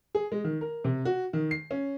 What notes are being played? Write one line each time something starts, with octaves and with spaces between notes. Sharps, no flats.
G#4
G#3
D#3
A#4
C3
F#4
D#3
C7
C#4